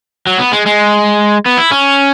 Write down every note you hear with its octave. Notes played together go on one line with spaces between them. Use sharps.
F#3
B3
G#3
G#3
B3
E4
C#4